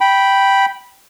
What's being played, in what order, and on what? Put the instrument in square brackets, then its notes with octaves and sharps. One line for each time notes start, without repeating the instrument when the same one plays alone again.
[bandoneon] G5 B5